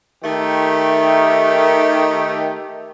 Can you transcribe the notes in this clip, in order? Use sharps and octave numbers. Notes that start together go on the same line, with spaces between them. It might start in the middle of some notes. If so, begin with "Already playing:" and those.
D#3 A3 G4